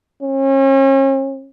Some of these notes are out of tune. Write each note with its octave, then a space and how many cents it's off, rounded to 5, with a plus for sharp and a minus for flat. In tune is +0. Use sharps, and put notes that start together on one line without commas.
C#4 -40